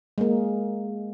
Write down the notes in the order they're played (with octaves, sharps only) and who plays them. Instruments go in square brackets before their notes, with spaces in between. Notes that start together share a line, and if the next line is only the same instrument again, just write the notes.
[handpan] G#3 A#3